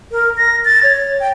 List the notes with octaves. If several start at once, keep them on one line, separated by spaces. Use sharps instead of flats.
A#4
A#6
A6
C#5
G5